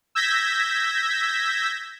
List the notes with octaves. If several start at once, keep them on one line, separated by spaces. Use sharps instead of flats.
E6 G6 G#6 A#6 B6